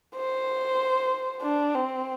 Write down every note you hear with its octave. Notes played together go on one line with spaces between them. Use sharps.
C5
D4
C4